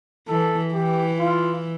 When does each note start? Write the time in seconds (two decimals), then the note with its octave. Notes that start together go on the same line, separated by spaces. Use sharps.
0.28 E3 A4
0.73 E3 G4
1.19 F4